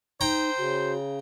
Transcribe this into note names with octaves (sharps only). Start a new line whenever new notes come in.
D#4 C5 G5 A#5
C#3 F#4